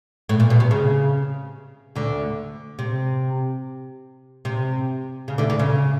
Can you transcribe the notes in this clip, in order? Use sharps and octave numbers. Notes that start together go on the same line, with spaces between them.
A2
A#2
B2
C3
C#3
D2 D3
C3
C3
C#3
D2 D3
D2 D3
C#3